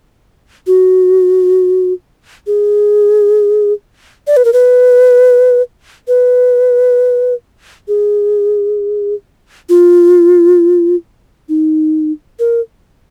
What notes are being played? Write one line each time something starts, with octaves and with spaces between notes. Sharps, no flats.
F#4
G#4
D5
B4
A#4
B4
B4
G#4
F4
D#4
A#4